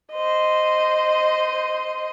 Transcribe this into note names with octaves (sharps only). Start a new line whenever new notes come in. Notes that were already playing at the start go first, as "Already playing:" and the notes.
C5 D#5